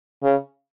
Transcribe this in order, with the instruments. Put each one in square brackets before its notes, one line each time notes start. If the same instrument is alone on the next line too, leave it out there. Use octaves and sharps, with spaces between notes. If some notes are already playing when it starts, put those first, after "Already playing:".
[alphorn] C#3